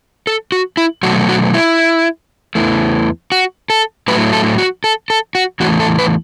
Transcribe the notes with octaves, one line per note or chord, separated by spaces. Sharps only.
A4
F#4
E4
B2 F#3 A3 F#4
F#4
E4
E2 E3 A3
F#4
A4
A2 F#3 A3 B4
A4
F#4
A4
A4
F#4
E2 E3 A3 F#4
A4
B4